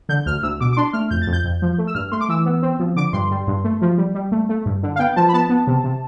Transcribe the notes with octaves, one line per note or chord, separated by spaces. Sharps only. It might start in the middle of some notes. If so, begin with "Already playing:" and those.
D3 G6
D2 F6
D2 E6
B2 D6
D6
D4 C6
A3 F6
F2 G6
A6
F2
G6
F2
F3
A3
E6
G2 F6
A3 C6
D6
E3 E6
B3
C4
F3
D3 D6
G2 C6
G3
G2
A3
F3
G3
G3
A3
A3
G2
D3
F5
B3 G5
F3 A5
B5
B3 A5
B3
C3
C3